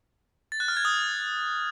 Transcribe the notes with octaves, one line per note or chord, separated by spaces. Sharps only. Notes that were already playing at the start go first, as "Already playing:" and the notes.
A6
F#6
F6
G#6
D#6